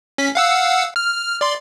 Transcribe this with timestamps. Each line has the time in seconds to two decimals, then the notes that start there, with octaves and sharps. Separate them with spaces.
0.18 C#4 B6
0.35 F5 F#5 E6
0.96 F6
1.41 D5 C6